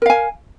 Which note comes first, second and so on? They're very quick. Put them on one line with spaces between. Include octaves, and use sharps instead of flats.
A#4 F5 G#5